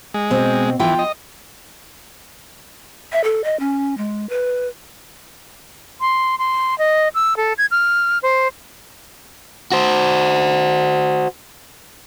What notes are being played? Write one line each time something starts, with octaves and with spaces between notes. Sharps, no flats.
G#3
B2 C4
F2 E3 F4 G5
D#5
E5
A4
D#5
C#4
G#3
B4
C6
C6
D#5
E6
A4
G#6
F6
C5
F#4 C5